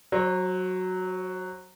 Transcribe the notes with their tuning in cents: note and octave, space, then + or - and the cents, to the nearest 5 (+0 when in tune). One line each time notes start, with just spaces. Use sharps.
F#3 +0 C5 +45